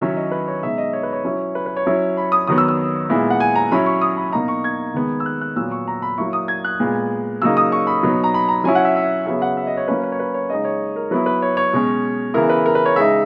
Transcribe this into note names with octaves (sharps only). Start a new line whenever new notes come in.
D#3 F#3 C#4 E4 E5
D#5
B4
C#5
B2 G#3 D#4 E5
D#5
C#5
B4
C#5
F#3 C#4 E4
B4
B4
C#5
F#3 C#4 E4
B5
D#6
D#3 F#3 B3 D#6
E6
E6
A#2 G#3 B3 E4
F#5
G#5
A#5
F#3 C#4 E4 B5
C#6
D#6
B5
B2 A#3 D#4 A#5
C#6
G#6
D#3 G#3 B3
E6
F#6
F#6
A#2 F#3 B3 E6
C#6
A#5
B5
F#3 A#3 E4 C#6
D#6
G#6
F#6
A#2 G#3 B3
C#3 F#3 A#3 D#4 E6
D#6
C#6
B5
B2 F#3 B3 D#4
A#5
B5
A#5
F#3 C#4 E4 G#5
F#5
E5
E5
C#3 F#3 B3 E5
F#5
E5
D#5
C#5
F#3 A#3 C#4 B4
B4
C#5
B4
C#5
C#3 G#3 D#4 D#5
C#5
A#4
F#3 B3 E4 B4
B4
C#5
C#5
B2 G#3 C#4
C#3 E3 B3 E4 A#4
B4
A#4
B4
C#5
C#3 G#3 D#4 E5